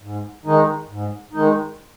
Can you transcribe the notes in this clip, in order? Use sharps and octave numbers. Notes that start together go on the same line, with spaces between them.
G#2
D#3 G#3 D#4
G#2
D#3 G#3 D#4